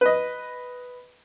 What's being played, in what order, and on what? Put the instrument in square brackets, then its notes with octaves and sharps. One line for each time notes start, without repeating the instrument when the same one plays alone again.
[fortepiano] B4 D#5